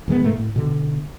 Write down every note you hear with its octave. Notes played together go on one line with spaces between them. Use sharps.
D#1 D#3 G#3 B3
G#2 C3 A3 A#3
A2
B2 D3